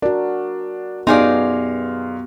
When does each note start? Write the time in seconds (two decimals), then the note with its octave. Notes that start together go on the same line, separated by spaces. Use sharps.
0.02 D4 F#4 A#4
1.07 F#2 B3 D#4 G4 G#4 D5 F5 C6